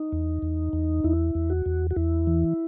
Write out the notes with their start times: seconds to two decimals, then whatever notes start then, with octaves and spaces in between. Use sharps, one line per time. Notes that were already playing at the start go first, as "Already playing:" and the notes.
Already playing: D#4
0.12 E2
0.42 E2
0.73 E2
1.04 E2 E4
1.35 E2
1.50 F#4
1.66 E2
1.91 F#4
1.96 E2 E4
2.27 E3